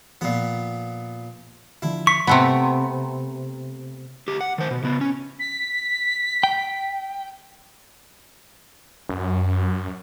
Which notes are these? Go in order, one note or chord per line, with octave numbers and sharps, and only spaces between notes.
A#2 F3 B3
D3 F3 E4
C#6 B6
C3 A3 B3
D2 G4
F#5
D#3 C5
B2
C#3 B3
C#4
B6
G5
F#2